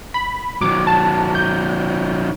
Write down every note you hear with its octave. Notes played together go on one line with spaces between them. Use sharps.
B5
D#3 F#3 D6
A5
G6